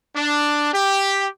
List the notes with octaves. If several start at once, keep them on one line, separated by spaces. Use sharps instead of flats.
D4
G4